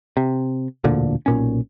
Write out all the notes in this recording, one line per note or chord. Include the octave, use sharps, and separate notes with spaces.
C3
E1 D2 A#2 D3
B1 A#2 C#4